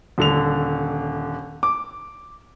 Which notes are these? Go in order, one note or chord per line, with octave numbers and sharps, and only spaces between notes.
D#1 D3 F7
D6